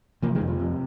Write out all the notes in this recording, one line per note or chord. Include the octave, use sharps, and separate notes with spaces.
C3 F3 A#3
D#3 G#3
F2
F3
C3